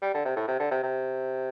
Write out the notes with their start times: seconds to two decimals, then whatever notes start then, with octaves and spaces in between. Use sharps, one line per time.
0.02 G3
0.14 D3
0.25 C3
0.36 A2
0.48 C3
0.60 D3
0.71 C3
0.83 C3